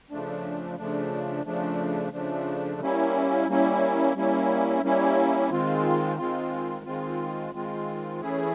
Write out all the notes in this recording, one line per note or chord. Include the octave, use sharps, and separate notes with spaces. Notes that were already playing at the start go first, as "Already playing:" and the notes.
C#3 F3 A3 D4
C#3 F3 A3 D4
C#3 F3 A3 D4
C#3 F3 A3 D4
G3 A#3 C#4 E4
G3 A#3 C#4 E4
G3 A#3 C#4 E4
G3 A#3 C#4 E4
D#3 G#3 C4 F4
D#3 G#3 C4 F4
D#3 G#3 C4 F4
D#3 G#3 C4 F4
E3 A3 C#4 E4 G#4